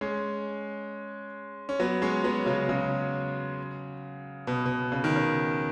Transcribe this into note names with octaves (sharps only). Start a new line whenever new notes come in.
G#3 C#4
C#4
F#3 B3
G#3 C#4
F#3 B3
C#3 F#3
C#3 F#3
B2
B2
C#3
D#3
C#3